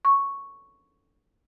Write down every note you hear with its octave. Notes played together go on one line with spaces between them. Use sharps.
C#6